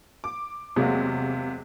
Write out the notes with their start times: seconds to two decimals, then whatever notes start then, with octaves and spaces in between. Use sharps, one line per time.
0.24 D6
0.76 E2 C3 F#3 G#3 A#3